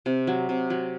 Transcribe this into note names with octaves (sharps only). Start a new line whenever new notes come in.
C3
F#3
C3
F#3